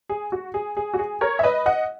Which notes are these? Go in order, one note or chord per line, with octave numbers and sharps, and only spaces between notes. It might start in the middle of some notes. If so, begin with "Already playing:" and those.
G#4
F#4
G#4
G#4
F#4
G#4
A#4 C#5
E5
B4 D#5
D#5 F#5